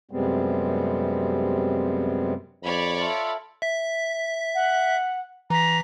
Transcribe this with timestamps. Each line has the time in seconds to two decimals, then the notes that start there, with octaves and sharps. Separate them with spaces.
0.11 F#2 C3 G3 G#3 B3 C4
2.64 F2 C#5 D5 B5
2.98 F4 A4 E5
3.62 E5 B6
4.55 F#5
5.50 E3 A#5 B6